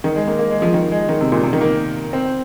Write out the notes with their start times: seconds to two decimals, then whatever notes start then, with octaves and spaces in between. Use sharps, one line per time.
0.04 D#3
0.16 G#3
0.27 A#3
0.39 A#3
0.51 G#3
0.62 F3
0.74 D#3
0.91 G#3
1.09 D#3
1.21 C3
1.32 A#2
1.43 C3
1.53 D#3
1.61 A#3
2.13 C4